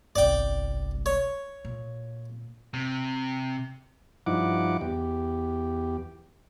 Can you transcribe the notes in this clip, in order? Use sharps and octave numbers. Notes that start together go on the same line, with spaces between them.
G1 C2 D5 G5
C#5
A#2
C3
G2 F3 D#4 E4 F#5 D6
E2 G4